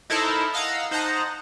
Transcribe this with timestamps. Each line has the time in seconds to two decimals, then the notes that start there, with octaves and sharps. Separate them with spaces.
0.10 D#4 E4 A4 A#4 C5 A5
0.54 D#5 F5 F#5 A#5 E6
0.91 D#4 C5 D#5 F#5 A5 A#5